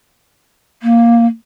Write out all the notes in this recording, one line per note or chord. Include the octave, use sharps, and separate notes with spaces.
A#3